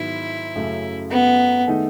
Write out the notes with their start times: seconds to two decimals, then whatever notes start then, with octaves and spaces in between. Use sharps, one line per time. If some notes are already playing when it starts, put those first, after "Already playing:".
Already playing: G#2 D#3 F#3 B3 E4
0.56 F#2 C#3 F#3 A3
1.11 B3
1.67 D#3 A3 D#4 G#4